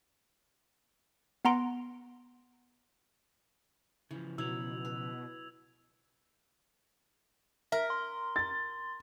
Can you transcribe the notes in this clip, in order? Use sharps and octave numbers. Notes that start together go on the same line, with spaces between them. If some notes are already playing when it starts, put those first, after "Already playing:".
B3 F#5 A#5 C6 D7
C#3 E3 F3
B2 F#3 E4 B4 E6 G#6 F7
B4
A#4 E5
C6
A6